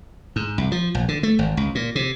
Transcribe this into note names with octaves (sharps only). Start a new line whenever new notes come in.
G#2
C2
F3
A#1
D3
A3
G#1
C#2
A#2
C3